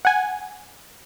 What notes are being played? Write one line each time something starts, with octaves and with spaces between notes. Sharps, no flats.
F#5 G#5